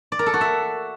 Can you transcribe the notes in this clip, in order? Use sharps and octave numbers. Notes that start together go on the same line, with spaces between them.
D5
A#4
A4
F#4
E5